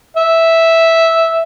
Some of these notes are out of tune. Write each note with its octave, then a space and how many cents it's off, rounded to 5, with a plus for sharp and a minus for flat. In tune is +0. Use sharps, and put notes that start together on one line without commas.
E5 -5